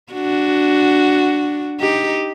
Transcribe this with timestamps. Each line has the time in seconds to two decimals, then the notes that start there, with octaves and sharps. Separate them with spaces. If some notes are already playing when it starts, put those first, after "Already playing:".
0.13 D4 F#4
1.80 D#4 G4